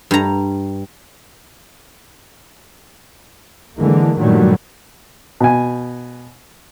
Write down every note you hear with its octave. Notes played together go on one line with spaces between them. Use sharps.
G2 A#5
D3 E3 G#3 A#3
G2 A#2 D#3 F#3 G3 A3
B2 G#5